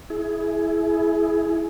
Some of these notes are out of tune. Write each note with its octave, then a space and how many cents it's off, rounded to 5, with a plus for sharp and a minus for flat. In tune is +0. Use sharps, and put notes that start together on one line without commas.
E4 +0 G#4 +20